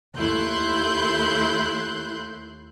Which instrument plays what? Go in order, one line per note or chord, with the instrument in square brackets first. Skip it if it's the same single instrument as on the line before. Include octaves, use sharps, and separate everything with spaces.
[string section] D#2 A3 E4 C6 F#6 G6